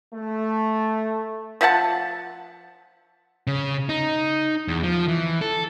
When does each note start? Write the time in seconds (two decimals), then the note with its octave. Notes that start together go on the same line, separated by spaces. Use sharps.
0.14 A3
1.61 F3 E5 F#5 A5
3.47 C#3
3.89 D#4
4.68 E2
4.83 F3
5.08 E3
5.41 A4